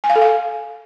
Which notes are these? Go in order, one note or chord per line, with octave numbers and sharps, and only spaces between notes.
G#5
F5
A4
F5